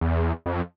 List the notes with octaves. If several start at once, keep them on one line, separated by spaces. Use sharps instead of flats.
E2
F2